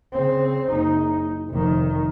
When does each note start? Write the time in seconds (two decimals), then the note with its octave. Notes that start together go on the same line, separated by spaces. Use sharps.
0.12 C#3 C4
0.70 F#1 D#4
1.50 F1 D#3